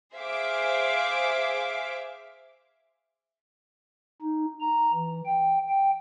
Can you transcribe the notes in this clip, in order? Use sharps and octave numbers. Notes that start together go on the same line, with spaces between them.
G#4 C5 E5 F5 D6
D#4
A#5
E3
G5
G5